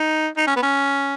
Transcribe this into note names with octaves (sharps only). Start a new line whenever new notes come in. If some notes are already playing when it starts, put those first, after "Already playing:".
Already playing: D#4
D#4
C#4
B3
C#4